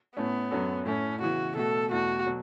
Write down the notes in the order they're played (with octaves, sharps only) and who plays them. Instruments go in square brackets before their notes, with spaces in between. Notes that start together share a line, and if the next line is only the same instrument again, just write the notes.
[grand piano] A2 A3 C#4 [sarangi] B3
[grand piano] F#2 F#3 C#4 F#4 A4
[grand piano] A2 A3 E4 A4 [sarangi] C#4
[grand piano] C#3 E3 B3 [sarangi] F#4
[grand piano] B2 A3 F#4 [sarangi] A4
[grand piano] E2 B2 A3 [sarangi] F#4
[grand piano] B2 F#3